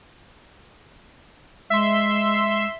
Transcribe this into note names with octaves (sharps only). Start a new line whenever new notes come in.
G#3 E5 C6